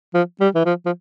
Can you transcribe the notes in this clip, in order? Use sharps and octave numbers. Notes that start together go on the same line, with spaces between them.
F3
G3
E3
F3
F3